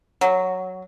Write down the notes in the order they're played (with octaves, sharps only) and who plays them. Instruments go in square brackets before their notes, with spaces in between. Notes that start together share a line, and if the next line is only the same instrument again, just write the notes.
[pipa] F#3